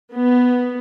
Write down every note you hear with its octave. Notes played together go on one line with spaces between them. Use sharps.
B3